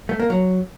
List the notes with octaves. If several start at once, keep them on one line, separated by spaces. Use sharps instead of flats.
A3
A#3
F#3